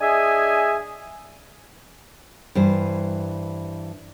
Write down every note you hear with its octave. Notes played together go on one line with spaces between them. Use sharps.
D4 G#4 D#5 E5 G#5
G2 E3 C5